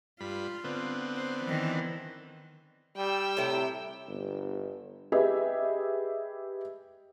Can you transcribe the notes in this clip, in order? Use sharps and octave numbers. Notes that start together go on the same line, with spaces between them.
G2 F4 B5
D3 B3 C4
C5
D#3 E3
G3 G5 E6
A2 C3 E4
G1
G4 G#4 B4 D#5 E5